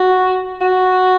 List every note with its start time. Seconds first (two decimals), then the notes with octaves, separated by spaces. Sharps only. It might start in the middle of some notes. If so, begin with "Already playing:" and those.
Already playing: F#4
0.61 F#4